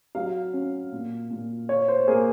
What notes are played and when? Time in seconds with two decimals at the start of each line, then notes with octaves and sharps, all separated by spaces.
0.15 F#3 F5
0.53 C#4
0.92 A#2
1.30 A#2
1.69 F4 C#5
1.88 C5
2.08 A#3 G#4